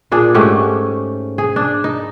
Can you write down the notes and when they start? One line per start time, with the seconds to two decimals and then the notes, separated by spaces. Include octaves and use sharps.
0.11 A#2 D4 G#4
0.34 G#2 A3 C#4 G4
1.38 G#4
1.56 D4
1.84 D#4